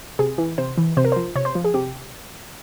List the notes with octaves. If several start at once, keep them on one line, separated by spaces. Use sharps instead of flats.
C3 G#4
E3
C3 C5
E3
C3 C5
A#4
F3 C5
C3 C#5
C5
F3
G#4
C3 G4